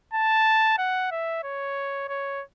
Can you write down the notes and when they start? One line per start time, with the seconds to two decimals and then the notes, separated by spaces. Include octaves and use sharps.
0.13 A5
0.78 F#5
1.11 E5
1.44 C#5
2.09 C#5